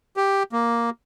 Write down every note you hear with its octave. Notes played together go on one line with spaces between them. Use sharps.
G4
A#3